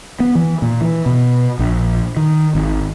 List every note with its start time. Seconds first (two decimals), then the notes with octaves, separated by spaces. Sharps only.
0.20 B3
0.35 E3
0.62 A#2
0.81 E3
1.06 B2
1.59 A#1
2.17 D#3
2.55 G#1